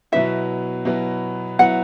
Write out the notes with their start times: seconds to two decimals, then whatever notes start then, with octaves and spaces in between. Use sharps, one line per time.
0.12 B2 F#3 B3 E4 E5
0.85 B2 F#3 B3 E4
1.59 F#3 B3 E4 F#5